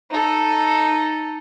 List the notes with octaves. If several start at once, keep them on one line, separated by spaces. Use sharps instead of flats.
D#4 A4